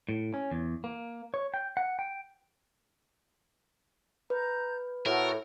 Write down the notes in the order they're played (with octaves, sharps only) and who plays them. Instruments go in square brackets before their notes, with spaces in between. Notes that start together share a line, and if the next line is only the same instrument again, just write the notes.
[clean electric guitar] A2
C#4
E2
A#3
C#5
G5
F#5
G5
[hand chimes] B4 [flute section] A#5 G6
[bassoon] A2 [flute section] F#4 A4 F#5 [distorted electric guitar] A#4